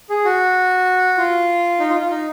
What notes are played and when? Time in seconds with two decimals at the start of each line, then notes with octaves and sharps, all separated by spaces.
0.10 G#4
0.25 F#4
1.18 F4
1.80 D#4
1.89 F4
2.00 F4
2.10 D#4